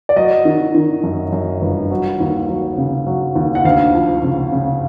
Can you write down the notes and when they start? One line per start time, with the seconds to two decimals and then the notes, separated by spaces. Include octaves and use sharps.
0.09 D5
0.16 F#3 D#5
0.45 D#3
0.75 D#3
1.04 F#2
1.33 F#2
1.62 G1
1.91 F#3
2.20 D#2
2.49 F#3
2.78 C#3
3.06 F#3
3.35 D#2
3.55 F#5
3.65 D2 F5
3.94 F3
4.23 C#3
4.52 C#3